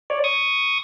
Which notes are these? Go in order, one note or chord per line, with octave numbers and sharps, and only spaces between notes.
C#5 D5
C#6 D#6